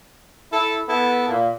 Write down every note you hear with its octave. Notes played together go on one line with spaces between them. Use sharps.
E4 A4
B3 E4 A4
A#2